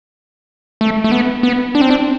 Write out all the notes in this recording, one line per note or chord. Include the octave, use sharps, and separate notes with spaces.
A3
A3
B3
B3
D4
C4
D4